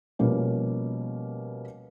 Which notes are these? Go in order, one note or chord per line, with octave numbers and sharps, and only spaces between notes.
B2 F3 G3 A#3 C#4